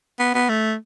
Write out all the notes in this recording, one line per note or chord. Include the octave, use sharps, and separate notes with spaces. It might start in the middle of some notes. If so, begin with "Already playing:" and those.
B3
B3
A3